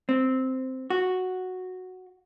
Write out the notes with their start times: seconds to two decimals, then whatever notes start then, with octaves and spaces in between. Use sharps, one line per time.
0.09 C4
0.90 F#4